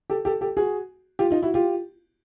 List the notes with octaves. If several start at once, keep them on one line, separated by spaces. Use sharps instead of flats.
G4 A4
G4 A4
G4 A4
F#4 G#4
F4 G4
D#4 F4
E4 F#4
F4 G4